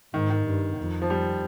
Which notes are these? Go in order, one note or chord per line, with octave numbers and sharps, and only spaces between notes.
G#2 D#3
D#3
G2
F2
F3
G3